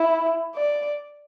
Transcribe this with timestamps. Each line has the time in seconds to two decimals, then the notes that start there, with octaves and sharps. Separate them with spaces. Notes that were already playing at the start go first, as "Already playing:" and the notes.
Already playing: E4
0.55 D5